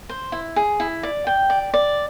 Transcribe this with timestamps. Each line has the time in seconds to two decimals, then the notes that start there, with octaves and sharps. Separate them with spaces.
0.09 C5
0.32 E4
0.56 G#4
0.80 E4
1.03 D5
1.27 G5
1.50 D5
1.74 D5